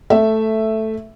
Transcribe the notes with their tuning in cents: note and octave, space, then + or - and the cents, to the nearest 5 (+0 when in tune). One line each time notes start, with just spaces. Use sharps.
A3 +0 E5 +0